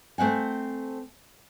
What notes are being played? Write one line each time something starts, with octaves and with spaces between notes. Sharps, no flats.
A3 C4 F#5 G#5